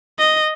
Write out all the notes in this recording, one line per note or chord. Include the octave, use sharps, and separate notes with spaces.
D#5